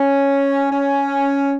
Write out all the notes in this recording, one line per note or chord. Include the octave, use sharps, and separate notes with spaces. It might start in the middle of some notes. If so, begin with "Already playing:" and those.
Already playing: C#4
C#4